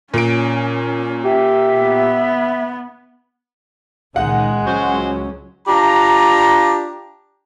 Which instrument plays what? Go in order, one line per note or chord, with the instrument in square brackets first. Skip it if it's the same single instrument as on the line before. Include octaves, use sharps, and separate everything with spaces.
[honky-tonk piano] A#2 D7 [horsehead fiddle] C#4
[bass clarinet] G4 [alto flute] E5
[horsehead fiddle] B3
[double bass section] C#2 A#2 D#3 [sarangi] G#3 [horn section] D#4 [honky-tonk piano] F#5
[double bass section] C#2 F#3 C#4 [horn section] F#4 C5
[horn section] D4 F4 G4 A#5